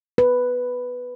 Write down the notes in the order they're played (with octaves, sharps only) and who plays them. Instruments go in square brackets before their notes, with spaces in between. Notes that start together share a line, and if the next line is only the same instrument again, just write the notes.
[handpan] B4